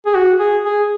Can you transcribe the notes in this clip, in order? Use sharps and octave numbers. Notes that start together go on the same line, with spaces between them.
G#4
F#4
G#4
G#4